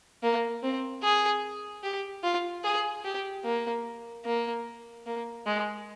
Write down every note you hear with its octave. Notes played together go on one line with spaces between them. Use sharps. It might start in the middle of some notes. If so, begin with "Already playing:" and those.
A#3
C4
G#4
G4
F4
G#4
G4
A#3
A#3
A#3
G#3